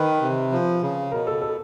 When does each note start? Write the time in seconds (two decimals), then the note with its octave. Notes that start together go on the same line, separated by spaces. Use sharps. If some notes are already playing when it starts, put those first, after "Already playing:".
Already playing: D#3 B4
0.22 C3
0.52 F3
0.82 C#3
1.11 B2 A#4
1.27 A4
1.42 A4